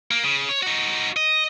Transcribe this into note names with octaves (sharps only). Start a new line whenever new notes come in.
A#3
C#3
C#5
D#4 F#4
D#5